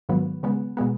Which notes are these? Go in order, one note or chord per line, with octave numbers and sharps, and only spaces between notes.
G#2 D#3 F#3 B3
C#3 G#3 B3
B2 G#3 B3